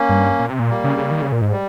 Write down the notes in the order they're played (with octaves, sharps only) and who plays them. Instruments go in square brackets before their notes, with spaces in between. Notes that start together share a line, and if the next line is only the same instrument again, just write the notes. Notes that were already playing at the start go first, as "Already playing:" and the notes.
Already playing: [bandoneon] A#3 C#4
[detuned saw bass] G2
A#2
C3
A#2
[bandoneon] G3 A#3
[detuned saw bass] C#3
C#3
D#3
C#3
A#2
G#2
[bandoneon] G3